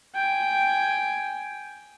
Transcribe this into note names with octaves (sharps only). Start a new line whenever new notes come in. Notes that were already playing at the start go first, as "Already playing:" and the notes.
G5 G#5